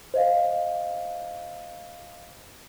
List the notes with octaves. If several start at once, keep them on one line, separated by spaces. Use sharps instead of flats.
C5 D#5 F5